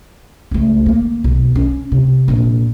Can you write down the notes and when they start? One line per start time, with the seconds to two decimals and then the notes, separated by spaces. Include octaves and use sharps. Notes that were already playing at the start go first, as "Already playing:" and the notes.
0.51 C#2 A3
0.86 D#3 A#3
1.24 B1
1.55 C#4
1.92 C3
2.28 A#1 F2